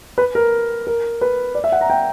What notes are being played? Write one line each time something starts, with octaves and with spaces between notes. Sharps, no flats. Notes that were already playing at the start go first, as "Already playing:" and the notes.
B4
A#4
A#4
B4
D5
E5
F#5
A#5
G5